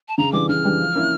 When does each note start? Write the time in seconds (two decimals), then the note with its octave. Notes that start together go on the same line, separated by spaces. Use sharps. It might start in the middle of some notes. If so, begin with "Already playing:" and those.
0.08 A5
0.18 C#3 A#5
0.33 E3 G3 D4 D6
0.49 C#3 F6
0.64 E3 G3 D4
0.80 F3
0.95 A#3 C#4 E4